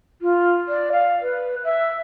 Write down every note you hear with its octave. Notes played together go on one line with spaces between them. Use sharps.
F4
D5
F5
B4
E5